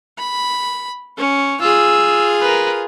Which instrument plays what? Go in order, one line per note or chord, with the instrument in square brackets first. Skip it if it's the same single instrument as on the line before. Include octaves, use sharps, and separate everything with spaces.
[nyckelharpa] B5
C#4
[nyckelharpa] F4 G#4 [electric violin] E6
[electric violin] A#4 B4